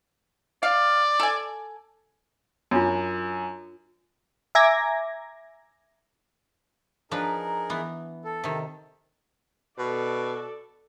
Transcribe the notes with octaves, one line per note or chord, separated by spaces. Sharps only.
D5 F5
A4 G#5
F#2 D4 F4
E5 G#5 A#5 D6 G#6 A#6
F3 D4 D#4 G#4 A#4 B4
E3 B3
A4
C3 D#3
B2 A4 D5